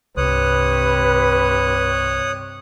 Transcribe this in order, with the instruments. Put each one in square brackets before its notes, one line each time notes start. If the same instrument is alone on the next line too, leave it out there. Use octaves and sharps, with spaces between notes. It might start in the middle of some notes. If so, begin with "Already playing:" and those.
[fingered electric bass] C2 [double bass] G2 C3 [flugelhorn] B4 [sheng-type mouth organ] C#5 D#6 F#6